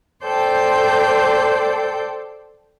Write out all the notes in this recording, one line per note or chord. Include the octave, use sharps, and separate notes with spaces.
A4 C5 D5 G5 G6